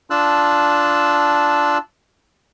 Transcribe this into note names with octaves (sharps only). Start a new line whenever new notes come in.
D4 F4 A5 E6 F#6